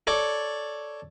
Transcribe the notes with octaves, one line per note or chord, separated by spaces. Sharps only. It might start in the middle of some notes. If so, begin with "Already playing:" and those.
A4 C#5 D5